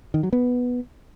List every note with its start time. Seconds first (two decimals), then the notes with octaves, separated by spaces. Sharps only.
0.14 D#3
0.23 F#3
0.33 B3